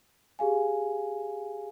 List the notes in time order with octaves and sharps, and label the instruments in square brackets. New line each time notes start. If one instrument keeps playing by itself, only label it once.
[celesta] G4 G#4 F5 G#5